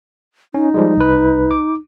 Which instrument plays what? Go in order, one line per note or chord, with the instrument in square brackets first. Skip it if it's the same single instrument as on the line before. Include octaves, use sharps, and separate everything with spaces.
[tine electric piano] C#4 [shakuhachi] D#4
[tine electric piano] F3 G3 G#3
C2 B4
D6